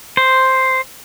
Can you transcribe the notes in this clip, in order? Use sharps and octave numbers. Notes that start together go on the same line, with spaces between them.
C5